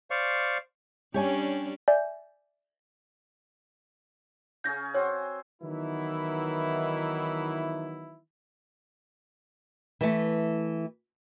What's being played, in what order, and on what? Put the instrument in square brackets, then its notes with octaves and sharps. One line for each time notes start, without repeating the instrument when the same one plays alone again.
[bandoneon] C5 D5 F5 C#6
[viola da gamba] G3 C#4 D4 [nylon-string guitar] G4 C#5 G#5
[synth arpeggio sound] D5 E5 G#5 G6
[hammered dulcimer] C#3 C#4 G#4 [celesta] G6 A#6
[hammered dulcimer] C4 F#4 C5 [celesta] C#5
[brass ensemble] D#3 E3 F#3 B3 D#4 E4
[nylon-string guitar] E3 A3